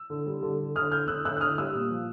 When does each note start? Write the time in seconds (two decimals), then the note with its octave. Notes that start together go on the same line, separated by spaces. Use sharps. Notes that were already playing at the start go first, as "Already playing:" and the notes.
Already playing: E6
0.10 D3
0.26 G3
0.42 D3
0.60 D3
0.76 D3 D#6 F6
0.91 D3 F6 G6
1.08 D3 E6 F#6
1.24 D3 E6 F#6
1.36 F#6
1.41 D3 D#6 F6
1.58 G3 E6 F#6
1.74 A#2
1.91 F3